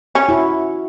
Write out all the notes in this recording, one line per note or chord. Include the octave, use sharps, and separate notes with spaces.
C#4
E4 F#4